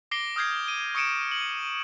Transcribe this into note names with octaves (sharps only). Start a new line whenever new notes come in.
D6 A#6 C7 D7 G7
D#6 F6 G6 G#6 C7
D#7
C#6 D#6 C#7 D7 E7
F#7